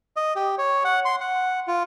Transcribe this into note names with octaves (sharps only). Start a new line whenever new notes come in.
D#5
G4
C#5
F#5
C6
F#5
F4